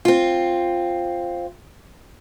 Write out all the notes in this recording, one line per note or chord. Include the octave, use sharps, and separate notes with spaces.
C4 F4